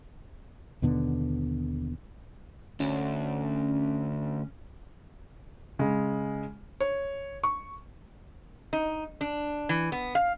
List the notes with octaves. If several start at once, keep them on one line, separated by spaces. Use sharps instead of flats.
D#2 B2 D3 B3
D2 C#4
C#3 G#3
C#5
C#6
D#4
D4
E3
B3
F5